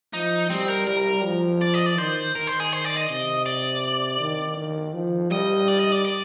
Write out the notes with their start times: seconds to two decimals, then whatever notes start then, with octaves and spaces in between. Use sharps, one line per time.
0.13 F3 D#4
0.50 G3 C4
0.69 A#4
0.87 G3 A#4
1.24 F3
1.61 D5
1.74 D#5
1.86 D5
1.98 D#3 C5
2.35 D#3 A#4
2.47 C5
2.60 G#4
2.72 C5
2.84 D5
2.97 D#5
3.10 C3
3.46 D5
4.20 D#3
4.57 D#3
4.94 F3
5.31 G3 D#5
5.68 D5
5.80 D#5
5.92 D5
6.05 D5